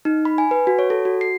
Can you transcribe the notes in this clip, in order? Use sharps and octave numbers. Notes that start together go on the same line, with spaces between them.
D#4
B5
G#5
B4
F#4
C#5
A4
F#4
C7